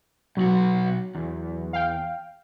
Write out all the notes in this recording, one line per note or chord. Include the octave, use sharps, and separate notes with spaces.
B1 F#3 F#4
E2
F5 G5